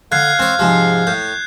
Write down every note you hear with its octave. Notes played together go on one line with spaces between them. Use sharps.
D3 F5 F#6 G#6 C7
C4 C#5
G#2 C3 F3
A2 G6